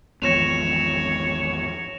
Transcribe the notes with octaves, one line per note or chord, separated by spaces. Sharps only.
G#1 E2 F3 C#5 A#6 E7 F7